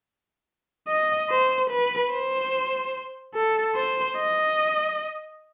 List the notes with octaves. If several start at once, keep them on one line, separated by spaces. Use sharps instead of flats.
D#5
C5
B4
C5
A4
C5
D#5